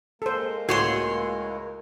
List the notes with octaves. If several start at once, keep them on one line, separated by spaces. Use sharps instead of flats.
G#3 A#3 A4 A#4 C5
C#2 A2 F#4 G#4 C#5 C6 E7